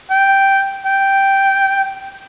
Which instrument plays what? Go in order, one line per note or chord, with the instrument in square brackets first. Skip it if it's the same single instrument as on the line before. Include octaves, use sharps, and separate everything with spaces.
[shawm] G5
G5